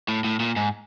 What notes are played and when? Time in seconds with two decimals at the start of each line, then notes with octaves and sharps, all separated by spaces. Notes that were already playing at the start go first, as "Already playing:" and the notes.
0.08 A2
0.24 A2
0.40 A#2
0.56 G#2